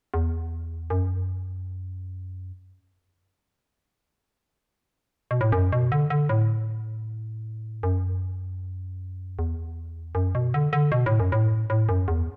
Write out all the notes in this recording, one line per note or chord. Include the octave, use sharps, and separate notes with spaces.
E2
F#2
B2
A2
F#2
B2
D3
D3
A2
F#2
E2
F#2
B2
D3
D3
B2
A2
F#2
A2
A2
F#2
E2